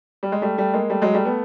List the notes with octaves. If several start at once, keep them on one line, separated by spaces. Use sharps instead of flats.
G3
G#3
G3 A3
G3 A3
G#3 A#3
G3 A3
F#3 G#3
G3 A3
A3 B3